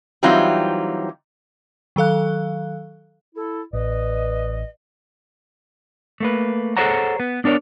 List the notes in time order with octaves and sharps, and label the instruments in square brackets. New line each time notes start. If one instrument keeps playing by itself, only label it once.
[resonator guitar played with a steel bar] E3 F#3 G3 C4 D#4 F4
[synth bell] D#3 F#3 A4 F5 F#6
[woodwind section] E4 A4
[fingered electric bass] A1 [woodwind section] B4 D5 D#5
[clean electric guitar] A3 A#3 B4
G#4 A4 C5 C#5 F#5 A#5
B3 B4
B3 D4 A#4 C#5 D5